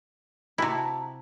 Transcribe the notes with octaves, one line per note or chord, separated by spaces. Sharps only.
C3 E4 F#4 A5 A#5